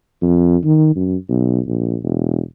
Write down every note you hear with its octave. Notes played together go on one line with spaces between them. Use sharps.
F2
D#3
F#2
B1
A#1
E1